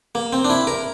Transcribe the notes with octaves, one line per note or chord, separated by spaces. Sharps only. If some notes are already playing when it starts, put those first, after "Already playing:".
A#3
C4
D4
E4
A#4